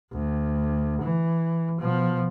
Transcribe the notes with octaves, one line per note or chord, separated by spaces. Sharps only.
D2
E3
B2 F3